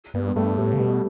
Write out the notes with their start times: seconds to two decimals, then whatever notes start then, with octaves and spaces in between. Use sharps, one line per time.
0.14 G2 B3
0.28 B3
0.36 G2 A3
0.57 A2 G3
0.73 C#3
0.79 B2 G3